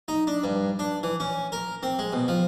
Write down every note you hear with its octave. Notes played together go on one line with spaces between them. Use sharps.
D#4
D4
G2
D4
E3
C#4
A#4
C4
G#3
B2
F3